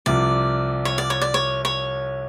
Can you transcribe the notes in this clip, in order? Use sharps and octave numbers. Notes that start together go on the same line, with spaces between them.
C2 C3 F3 D5
C#5
D5
C#5
D5
C#5
C#5